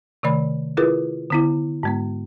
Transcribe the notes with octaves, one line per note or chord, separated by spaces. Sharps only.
C3 D#3 A3 D5 B5
E4 F4 G#4 A#4 B4
D3 B3 E4
G#2 G#3 B3